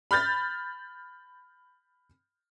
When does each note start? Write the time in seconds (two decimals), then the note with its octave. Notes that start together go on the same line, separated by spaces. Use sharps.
0.11 B5 F6 G6 A6